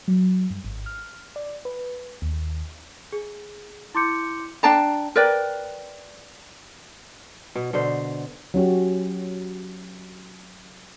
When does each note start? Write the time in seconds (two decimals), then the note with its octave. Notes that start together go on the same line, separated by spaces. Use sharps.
0.08 F#3
0.50 G2
0.64 G#1
0.86 F6
1.36 D5
1.65 B4
2.22 D#2
3.12 G#4
3.95 E4 C6 D6 G6 C#7
4.63 D4 G5 A5 A#5
5.16 A#4 B4 D5 G5
7.56 B2
7.73 B2 D3 C5
8.54 F#3 C#4 F#4 G4